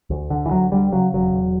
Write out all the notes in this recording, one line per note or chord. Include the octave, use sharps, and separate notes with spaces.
D2
D3
E3
D2 F#3
D3 G3
C#3 F#3
E1 F#3
E1